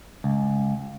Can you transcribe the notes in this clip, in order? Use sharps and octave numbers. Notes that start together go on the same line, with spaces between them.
C#2